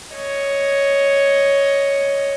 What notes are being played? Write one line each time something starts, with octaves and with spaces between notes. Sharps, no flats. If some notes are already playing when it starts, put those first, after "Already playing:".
C#5 D#5